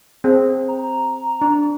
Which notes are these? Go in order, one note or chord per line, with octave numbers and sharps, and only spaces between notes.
C4 G#4
A#5
D4